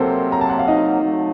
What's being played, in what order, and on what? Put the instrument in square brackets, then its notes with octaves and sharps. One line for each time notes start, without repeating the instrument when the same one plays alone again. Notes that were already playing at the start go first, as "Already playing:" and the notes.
Already playing: [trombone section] C3 F#3 A#3 [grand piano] C4 A4 A#4 C5
[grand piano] A#5
A5
F#5
F5
D#4 D#5
[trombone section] F#3 A3